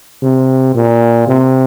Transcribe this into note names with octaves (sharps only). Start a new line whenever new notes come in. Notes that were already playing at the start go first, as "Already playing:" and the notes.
C3
A#2
C3